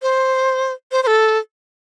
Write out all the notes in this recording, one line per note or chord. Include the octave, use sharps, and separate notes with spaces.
C5
C5
C5
A4